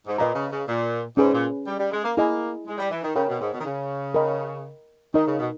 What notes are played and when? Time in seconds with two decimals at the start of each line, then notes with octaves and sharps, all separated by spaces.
0.07 G#2
0.18 A#2 B4 D#5 A#5
0.35 C#3
0.51 C#3
0.68 A#2
1.17 G#2 C#4 G#4 B4
1.34 A#2
1.67 G3
1.79 G3
1.92 G#3
2.04 A#3
2.17 A#3 E4 G#4 D#5 G#5 B5
2.67 G#3
2.78 G3
2.91 E3
3.03 D#3
3.16 C#3 A#4 C#5 G5 B5
3.28 B2
3.40 G#2
3.53 B2
3.60 D#3
3.66 C#3
4.14 A#4 D#5 G5 B5
5.14 D#3 D#4 A#4 D#5
5.27 C#3
5.39 B2